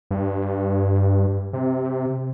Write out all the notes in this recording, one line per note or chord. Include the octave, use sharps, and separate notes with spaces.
G2
C3